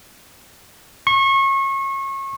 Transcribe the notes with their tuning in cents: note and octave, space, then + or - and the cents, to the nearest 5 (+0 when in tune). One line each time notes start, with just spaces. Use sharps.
C#6 -30